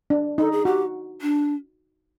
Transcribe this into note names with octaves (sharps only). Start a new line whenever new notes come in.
D4
D#4 A4
G#4
F#4 G4
D4